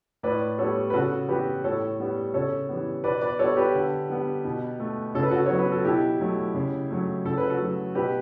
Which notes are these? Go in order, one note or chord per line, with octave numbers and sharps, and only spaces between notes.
A2 B4 D5
G3 B3 A4 C#5
B4
C#3 F#4 A4
E3 B3 G4 B4
A2 A4 C#5
G3 B3
C#3 A4 C#5
E3 G3 B3
B2 B4 D5
B4 D5
G3 B3 A4 C#5
G4 B4
D3
G3 B3
B2
A3
C#3 A4
B4
F#4 A4
F#3 B3 C#5
B4
A4
B2 E4 G4
F#3 A3
C#3
F#3 A3
C#3 A4
B4
F#4 A4
F#3 A3
B2 G4 B4